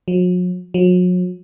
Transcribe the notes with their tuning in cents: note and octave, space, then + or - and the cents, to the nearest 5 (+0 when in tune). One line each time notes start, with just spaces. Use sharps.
F#3 -45
F#3 -40